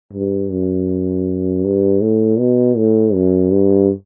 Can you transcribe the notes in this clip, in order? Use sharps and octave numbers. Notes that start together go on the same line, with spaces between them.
G2
F#2
G2
A2
B2
A2
F#2
G2